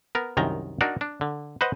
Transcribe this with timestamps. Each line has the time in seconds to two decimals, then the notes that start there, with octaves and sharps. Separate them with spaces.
0.15 B3 A#4
0.37 C2 F#2 D#3 A#5
0.81 D4 D#4 F#4 A#4 D5
1.01 D4
1.21 D3
1.61 B4 C5 D#5 F#5